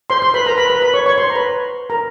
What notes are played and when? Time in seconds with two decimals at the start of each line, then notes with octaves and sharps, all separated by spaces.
0.10 C5 C6
0.22 C5 C6
0.34 B4 B5
0.46 A#4 A#5
0.58 B4 B5
0.70 B4 B5
0.82 B4 B5
0.94 C#5 C#6
1.06 C#5 C#6
1.18 C5 C6
1.30 A#5
1.35 B4 B5
1.90 A#4 A#5